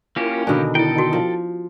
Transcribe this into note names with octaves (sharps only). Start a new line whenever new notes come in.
A#3 C#4 E4 F4 G4 A#4
B2 D3 D#3 D4 D#4 G#5
E4 A4 G5
F#4
F3